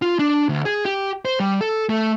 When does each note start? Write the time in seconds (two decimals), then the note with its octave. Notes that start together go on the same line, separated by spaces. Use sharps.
0.02 F4
0.19 D4
0.49 D2
0.65 G#4
0.85 G4
1.25 C5
1.40 G3
1.61 A4
1.89 A3